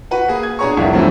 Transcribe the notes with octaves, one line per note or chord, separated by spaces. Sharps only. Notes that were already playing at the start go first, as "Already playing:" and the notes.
F#4 B4 F#5
A#3 G#4
G#6
B2 D4 G#4 C#5 A#5 C#6
F1 C2 D4 F4 E5
G2 E3 F#3 A3 C4 D4